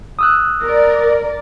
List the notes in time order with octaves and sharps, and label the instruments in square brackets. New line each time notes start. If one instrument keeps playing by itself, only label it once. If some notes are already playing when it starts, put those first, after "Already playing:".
[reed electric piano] D#6 E6 F#6
[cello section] A#4 D5